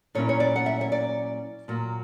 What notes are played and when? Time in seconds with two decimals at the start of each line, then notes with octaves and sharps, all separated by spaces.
0.15 A#2 F#3 C#4 E4 C#5
0.29 C#5
0.40 D5
0.56 F#5
0.66 E5
0.81 C#5
0.92 D5
1.68 A#2 F#3 A#3